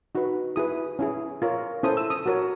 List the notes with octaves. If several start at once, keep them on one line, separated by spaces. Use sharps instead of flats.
D#4 F#4 B4
E4 G#4 B4 D#6
C#4 E4 G#4
F4 A#4 C#5
C#4 E4 A4 C5 D#6
E6
D#6
F#4 A#4 C#5